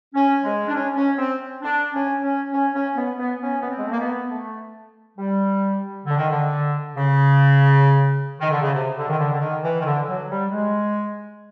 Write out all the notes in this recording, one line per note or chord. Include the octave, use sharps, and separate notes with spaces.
C#4
G#3
D4
C#4
C#4
C4
D4
C#4
C#4
C#4
C#4
B3
B3
C#4
B3
C4
G#3
A3
A#3
B3
A3
G3
D3
D#3
D3
C#3
D#3
D3
C#3
C3
D3
D#3
D3
D3
D#3
E3
D#3
D3
F#3
G3
G#3